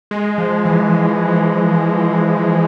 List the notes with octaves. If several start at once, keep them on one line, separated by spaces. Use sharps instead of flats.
G#3
F3
E3